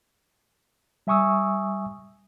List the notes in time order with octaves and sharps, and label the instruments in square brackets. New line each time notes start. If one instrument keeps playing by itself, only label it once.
[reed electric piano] G3 E5 G#5 C#6 D#6 E6